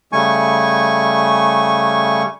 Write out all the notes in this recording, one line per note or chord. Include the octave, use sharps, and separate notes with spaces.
C#3 G3 A3 G#5 C#6